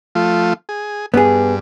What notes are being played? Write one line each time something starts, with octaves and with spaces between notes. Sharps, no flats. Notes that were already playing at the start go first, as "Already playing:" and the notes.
F3 A3 F4
G#4
G2 B3 G#4